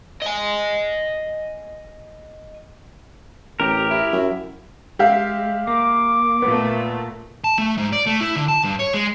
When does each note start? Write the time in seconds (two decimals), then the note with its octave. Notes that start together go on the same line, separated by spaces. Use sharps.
0.22 D#5 G#5
3.60 A1 G4 A#4
3.90 E4
4.13 F#2
4.99 G#3 G4 E5 F5
5.67 A#3 D6
6.42 A#2 A3 B3
7.44 A5
7.58 A3
7.78 G#2
7.93 D5
8.07 A3
8.21 E4
8.36 D3
8.48 A5
8.64 G2
8.79 C#5
8.94 G#3